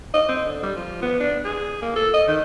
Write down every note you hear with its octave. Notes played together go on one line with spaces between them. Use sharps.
D#5
C4
D3
G3
F3
B3
D4
G#4
A#3
A4
D#5
D#3